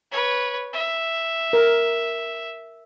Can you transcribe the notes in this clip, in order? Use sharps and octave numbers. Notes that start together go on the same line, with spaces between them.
B4 C#5
E5
A#4